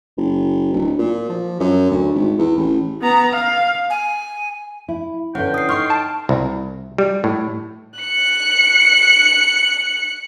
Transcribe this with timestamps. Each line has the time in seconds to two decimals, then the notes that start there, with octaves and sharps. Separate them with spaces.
0.18 F#1
0.73 D1
0.99 A#2
1.29 F3
1.60 F#2
1.90 D2
2.15 G#1
2.39 E2
2.58 A1
3.01 B3 A#5
3.33 F5
3.90 G#5
4.88 E4
5.35 G2 D3 C#4 E4 F#5 G5
5.54 D#6 C7
5.69 D#4 C6 C#6 F6 C7
5.90 A5 D7
6.29 C2
6.98 G3
7.24 A2
8.00 F#6 C#7